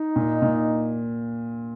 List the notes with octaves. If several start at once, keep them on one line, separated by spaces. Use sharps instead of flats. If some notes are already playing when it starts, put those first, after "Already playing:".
Already playing: D#4
A#2
A#2